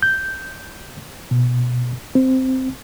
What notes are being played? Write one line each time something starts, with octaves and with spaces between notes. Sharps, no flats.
G6
B2
C4